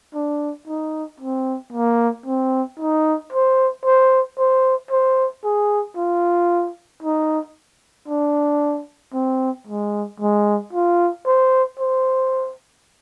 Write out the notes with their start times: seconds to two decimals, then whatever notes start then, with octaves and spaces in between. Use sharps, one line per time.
0.15 D4
0.68 D#4
1.20 C4
1.73 A#3
2.26 C4
2.80 D#4
3.33 C5
3.85 C5
4.38 C5
4.91 C5
5.44 G#4
5.97 F4
7.03 D#4
8.08 D4
9.14 C4
9.67 G#3
10.20 G#3
10.73 F4
11.26 C5
11.80 C5